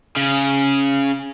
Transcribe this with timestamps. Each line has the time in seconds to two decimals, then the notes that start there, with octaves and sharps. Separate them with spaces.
0.16 C#3